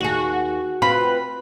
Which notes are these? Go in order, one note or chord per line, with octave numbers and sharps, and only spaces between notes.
D#2 F#4 G#4
C4 F4 B4 B5